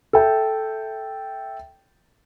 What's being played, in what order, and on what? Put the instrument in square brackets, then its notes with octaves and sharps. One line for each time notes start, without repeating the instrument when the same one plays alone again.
[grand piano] A4 E5 G5